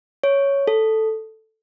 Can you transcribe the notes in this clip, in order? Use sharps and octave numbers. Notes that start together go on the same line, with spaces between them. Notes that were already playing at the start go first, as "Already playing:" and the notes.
C#5
A4